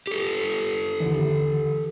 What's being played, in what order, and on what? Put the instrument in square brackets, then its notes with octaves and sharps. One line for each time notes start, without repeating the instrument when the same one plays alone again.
[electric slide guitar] G4 A4
[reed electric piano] D#2 D3 E3